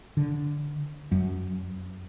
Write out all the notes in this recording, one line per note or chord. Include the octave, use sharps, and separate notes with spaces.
D3
F#2